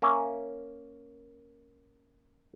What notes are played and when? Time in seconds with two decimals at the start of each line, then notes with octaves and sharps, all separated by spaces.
0.02 A#3 C#4 A#4 E5